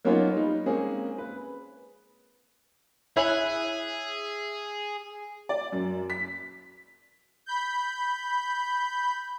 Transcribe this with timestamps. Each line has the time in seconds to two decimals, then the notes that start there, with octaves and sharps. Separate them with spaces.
0.05 F#3 A#3 B3 C#4 D#4 F4
0.34 G3 D#4
0.66 G#3 A#3 C4 C#4 G#4
1.18 B4
3.17 E4 G#4 C#5 E5 G#5 F#6
5.49 D5
5.72 F#2
6.10 B6
7.46 B5 G6